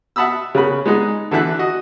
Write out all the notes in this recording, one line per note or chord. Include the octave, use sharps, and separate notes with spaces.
E5 F#5 A5 B5 D#6 E6
C#3 B3 A#4 B5
G#3 B3 D#4 G#4
D3 E3 A4 E5 F#6
F#4 D#5